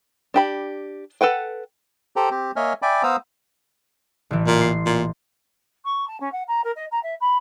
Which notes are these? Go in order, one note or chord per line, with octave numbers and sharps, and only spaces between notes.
D4 G4 B5
A4 B4 F#5 G5
G4 A4 C5 G5 A#5
C4 G4
A#3 C#5 D#5 E5 G#5 F6
D5 E5 G5 G#5 B5 D6
B3 C5 F5 A#5 D#6 E6
A1 E3
A#2
C6
A#2
C#6
A5
C#4
F#5
A#5
A#4
D#5
A#5
E5
B5